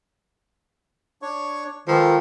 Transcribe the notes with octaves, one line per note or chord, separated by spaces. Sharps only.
D4 C#5 C#6
D#3 F3 G#3 A4 B4